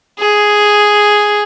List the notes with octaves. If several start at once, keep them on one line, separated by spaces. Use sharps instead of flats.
G#4